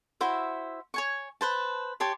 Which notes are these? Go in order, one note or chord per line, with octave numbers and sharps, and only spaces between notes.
E4 F#4 C5 E5
C#5 G#5 C#6
B4 C5 A5
G4 C#5 A5 C6